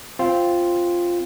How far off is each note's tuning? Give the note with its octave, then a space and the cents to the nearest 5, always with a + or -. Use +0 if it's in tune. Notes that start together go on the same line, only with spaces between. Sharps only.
C4 +0 F4 +0